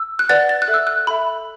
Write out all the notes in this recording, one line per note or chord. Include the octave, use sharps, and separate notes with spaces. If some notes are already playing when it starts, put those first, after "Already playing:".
Already playing: E6
F#6
B4 D5 F#5 A6
A6
F#6
A4 E5
E6
F#6
A4 E5 B5